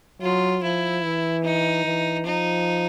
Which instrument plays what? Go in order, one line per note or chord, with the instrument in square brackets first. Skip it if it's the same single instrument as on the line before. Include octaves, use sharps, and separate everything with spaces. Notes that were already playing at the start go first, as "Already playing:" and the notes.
[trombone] F#3 [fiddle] F4
[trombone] F3 [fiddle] E4
[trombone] E3
[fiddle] D#4
[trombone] E3
[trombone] F3 [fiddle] D#4